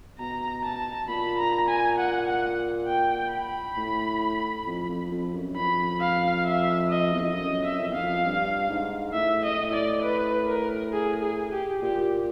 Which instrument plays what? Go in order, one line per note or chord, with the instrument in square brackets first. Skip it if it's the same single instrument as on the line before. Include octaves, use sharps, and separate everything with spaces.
[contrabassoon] B2 [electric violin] A#5
[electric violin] A5
[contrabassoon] A#2 [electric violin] B5
[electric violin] A#5
G#5
F#5
F#5
G5
B5
[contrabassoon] A2
F2
F2
F2
F#2
[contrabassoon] F2 [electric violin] B5
[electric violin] F5
E5
D#5
[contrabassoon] E2
F2
[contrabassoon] F#2 [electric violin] D#5
[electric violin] E5
[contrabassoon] F2
E2
[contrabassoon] F2 [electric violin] F5
[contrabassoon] G2
G#2
[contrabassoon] A2 [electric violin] E5
[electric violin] D#5
[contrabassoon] A2
[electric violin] D5
B4
A#4
G#4
G#4
G4
[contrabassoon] A#2 [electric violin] G4